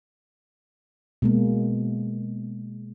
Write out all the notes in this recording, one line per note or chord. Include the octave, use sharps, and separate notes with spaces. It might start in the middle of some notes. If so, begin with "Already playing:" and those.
B2 G#3 A#3